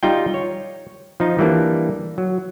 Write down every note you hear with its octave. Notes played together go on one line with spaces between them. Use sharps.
G3 D#4 F4 G5
C#5
F3 D#4
E3 G3 A#3 D4
F#3